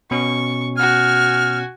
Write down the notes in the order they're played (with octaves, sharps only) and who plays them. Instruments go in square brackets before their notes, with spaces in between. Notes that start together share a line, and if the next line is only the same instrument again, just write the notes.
[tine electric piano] B2 C#4 [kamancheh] C#6
[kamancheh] F#4 G#5 [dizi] F6